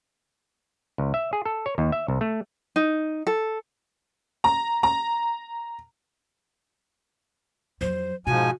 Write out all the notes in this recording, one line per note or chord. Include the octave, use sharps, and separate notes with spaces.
C#2
E5
G#4
A4
C#5
D#2
E5
C2
A3
D#4
A4
A#5
A#5
F2 F#3 C5
G#2 B2 F3 F#4 G#5